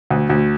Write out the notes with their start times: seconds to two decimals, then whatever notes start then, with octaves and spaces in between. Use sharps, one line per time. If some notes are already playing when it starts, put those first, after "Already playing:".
0.10 D2
0.29 D2